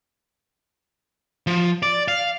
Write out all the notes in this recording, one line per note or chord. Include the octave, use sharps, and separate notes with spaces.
F3
D5
F5